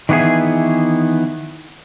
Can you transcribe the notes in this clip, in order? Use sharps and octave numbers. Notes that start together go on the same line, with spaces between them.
D#3 E3 B3 E4 G#4